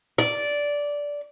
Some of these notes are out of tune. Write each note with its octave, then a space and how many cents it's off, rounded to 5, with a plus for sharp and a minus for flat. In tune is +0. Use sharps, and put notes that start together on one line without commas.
D5 -10